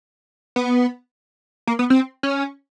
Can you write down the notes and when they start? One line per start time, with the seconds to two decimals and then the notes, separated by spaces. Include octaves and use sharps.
0.56 B3
1.67 A#3
1.79 B3
1.90 C4
2.23 C#4